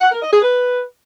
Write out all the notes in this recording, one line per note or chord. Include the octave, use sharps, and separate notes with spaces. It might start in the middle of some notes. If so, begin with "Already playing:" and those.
F#5
A#4
D#5
G#4
B4